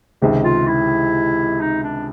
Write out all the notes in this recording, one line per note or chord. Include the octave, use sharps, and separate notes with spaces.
C#2 C3 D#3 G#3
F4
E4
D#4
D4